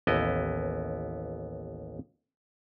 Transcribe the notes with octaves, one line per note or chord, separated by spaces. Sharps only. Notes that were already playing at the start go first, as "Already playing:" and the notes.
A1 D#2 B3 E4 D#5